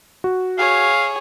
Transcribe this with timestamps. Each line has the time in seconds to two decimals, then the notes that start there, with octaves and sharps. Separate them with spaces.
0.24 F#4
0.58 G#4 C#5 F5